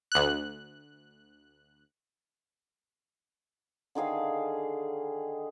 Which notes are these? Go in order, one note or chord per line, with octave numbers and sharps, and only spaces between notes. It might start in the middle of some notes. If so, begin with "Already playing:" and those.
D2 F#6
D3 D#3 G#4 F5